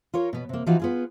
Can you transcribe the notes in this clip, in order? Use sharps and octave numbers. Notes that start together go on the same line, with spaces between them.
F4 A#4 C#5
B2 B3
C3 A#3
E3 F3 D#4 F4 F#4
B3 F4 G#4